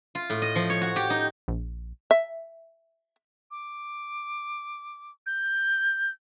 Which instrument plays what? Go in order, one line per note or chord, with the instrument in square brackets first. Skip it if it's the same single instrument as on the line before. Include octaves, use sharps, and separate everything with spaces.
[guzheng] F4
A2
D#5
F3
C#5
F#4
G4
D#4
[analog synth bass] A#1
[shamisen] E5
[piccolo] D6
G6